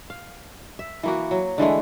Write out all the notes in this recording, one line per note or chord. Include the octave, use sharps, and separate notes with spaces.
F5
E5
E3 A#3 F#4
F#3
D3 E3 G#3 A3